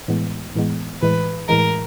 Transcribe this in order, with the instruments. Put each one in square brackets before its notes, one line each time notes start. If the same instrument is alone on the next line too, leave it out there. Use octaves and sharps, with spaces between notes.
[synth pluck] A2 E3 G#3 B3
A2 E3 G#3 B3
[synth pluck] A2 E3 G#3 [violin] B4
[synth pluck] A2 E3 G#3 [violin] A#4